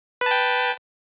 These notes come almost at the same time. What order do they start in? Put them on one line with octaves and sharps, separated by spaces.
B4 A5 G5